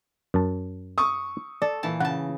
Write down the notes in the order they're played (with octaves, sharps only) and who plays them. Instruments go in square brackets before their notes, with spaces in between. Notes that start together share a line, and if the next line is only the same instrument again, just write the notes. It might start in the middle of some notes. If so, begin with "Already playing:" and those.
[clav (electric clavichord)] F#2 A5
[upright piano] C#6 D#6
[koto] A4 [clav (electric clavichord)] D5
[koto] A#2 E3 A5
[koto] C#3 A5 [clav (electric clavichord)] F#5